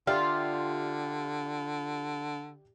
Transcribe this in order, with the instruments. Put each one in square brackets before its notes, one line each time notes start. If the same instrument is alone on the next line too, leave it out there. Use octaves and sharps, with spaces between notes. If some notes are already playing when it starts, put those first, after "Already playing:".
[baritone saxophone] D3 [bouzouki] F4 [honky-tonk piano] G4 D5 E5